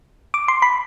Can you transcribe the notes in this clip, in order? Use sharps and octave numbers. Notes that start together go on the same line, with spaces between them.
D6
C6
B5